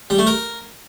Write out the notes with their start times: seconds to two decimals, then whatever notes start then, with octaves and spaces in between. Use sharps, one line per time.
0.10 G3
0.18 A3
0.27 A#4